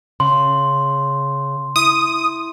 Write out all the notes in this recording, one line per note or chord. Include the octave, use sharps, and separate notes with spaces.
C#3 C6
E4 D#6